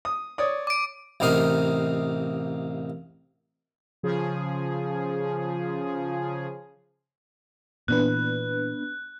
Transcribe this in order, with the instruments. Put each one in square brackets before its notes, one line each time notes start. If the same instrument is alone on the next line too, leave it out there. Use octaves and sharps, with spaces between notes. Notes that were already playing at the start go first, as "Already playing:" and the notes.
[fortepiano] D#6
C#5 D5 D#6
[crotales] D6 D7
[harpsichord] A1 C3 A#3 D#4 F5 D#6
[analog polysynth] C#3 F3 G#4
[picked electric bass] A#2 E3 [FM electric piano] B3 D4 B4 [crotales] F#6